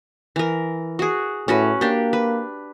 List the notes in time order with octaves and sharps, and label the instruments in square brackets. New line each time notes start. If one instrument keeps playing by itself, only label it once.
[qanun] E3 A#4
F#4 G#4
[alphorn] A2 [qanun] C#4 F#4 B4
[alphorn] A#3 [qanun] D4 G4
[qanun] B4